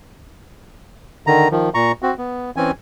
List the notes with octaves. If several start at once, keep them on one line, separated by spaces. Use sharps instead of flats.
D3 D#3 A#5
D#3 F3
A#2 A#5 C#6
C4 F#4
B3
E3 C4 C#4 G#5